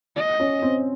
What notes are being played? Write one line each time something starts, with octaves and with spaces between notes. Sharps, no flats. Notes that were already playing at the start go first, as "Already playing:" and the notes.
D#5
C#4
C4